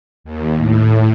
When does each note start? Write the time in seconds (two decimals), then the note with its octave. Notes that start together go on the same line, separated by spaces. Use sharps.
0.24 D#2
0.57 A2